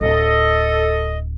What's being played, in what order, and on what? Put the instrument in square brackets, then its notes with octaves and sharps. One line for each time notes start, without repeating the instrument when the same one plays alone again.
[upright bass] D1 [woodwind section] A4 D#5